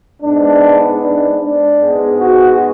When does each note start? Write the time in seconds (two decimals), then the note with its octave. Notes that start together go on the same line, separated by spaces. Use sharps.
0.22 G#2 G#3 B3 D4
1.01 D4
1.41 D4
1.81 G#2 G#3 B3
2.21 F#4